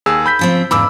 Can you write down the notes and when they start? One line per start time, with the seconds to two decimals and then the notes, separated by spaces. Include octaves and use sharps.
0.06 D#2 G#4 E6
0.26 B5 G6 B6
0.39 C#3 F3 C4
0.71 E2 G#2 C#3 B5 D6 E6